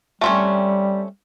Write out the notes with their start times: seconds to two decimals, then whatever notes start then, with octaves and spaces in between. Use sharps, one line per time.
0.21 G3 A3 C4 C#4